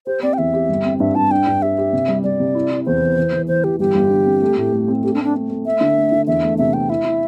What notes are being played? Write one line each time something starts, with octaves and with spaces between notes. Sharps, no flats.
G4 C5
C4 D5
G5
E2 E5
G4
G1
C4
G2 E5
G2 A5
D4 G5
G2
G4 E5
G4
C3
G3
G3 D5
C3
E4
E4
E2 C5
E3
E3
E3
E3 C5
E3 G4
G1 G4
G1
D3
C4
A3
A2
A3
C4
A3 G4
D4
A3
D4
A3
A3
A3 E5
D3
A3
D3
E2 E5
A3
C3 E5
C4 G5
E4 E5
E4